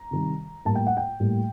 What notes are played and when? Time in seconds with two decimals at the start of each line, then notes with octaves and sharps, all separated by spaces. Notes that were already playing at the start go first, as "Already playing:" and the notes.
Already playing: A#5
0.11 C3 D#3 G3
0.65 A2 G3 A#3 A5
0.75 G5
0.87 F#5
0.97 G5
1.20 A2 G3 A#3